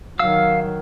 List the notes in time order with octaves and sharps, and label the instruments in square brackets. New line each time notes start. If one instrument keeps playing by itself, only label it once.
[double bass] D#3 F#3 [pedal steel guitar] F5 E6